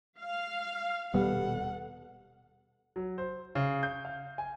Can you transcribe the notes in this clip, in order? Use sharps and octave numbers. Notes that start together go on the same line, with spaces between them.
F5
D#1 B2 G3 B3 A4 F#5
F#3
C5
C#3
G6
F5
G#5